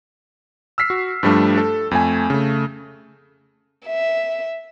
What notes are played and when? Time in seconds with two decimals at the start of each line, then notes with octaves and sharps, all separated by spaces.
0.78 E6 F6 B6 C7
0.90 F#4
1.23 G2 F3 G3 A3 D4
1.58 A4
1.91 F2 A3 G#5
2.30 C#3 A3
3.86 E5